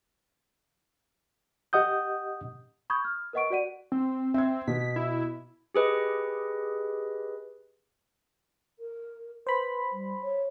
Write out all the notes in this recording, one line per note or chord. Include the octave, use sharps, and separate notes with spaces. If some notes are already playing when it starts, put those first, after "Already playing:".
G4 D#5 F#5 D#6 G6
B5 C#6 D#6 G6 G#6
F6
A#4 B4 D#5 F#5 C#6 D7
F#4 D5 F#5 D#7
C4
C4 E5 G#6
B2 B6
E4
G4 G#4 B4 D#5
A#4
B4 C5 B5
G3
C#5